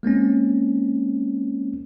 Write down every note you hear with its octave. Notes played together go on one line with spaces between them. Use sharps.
G#3 A#3 C4 C#4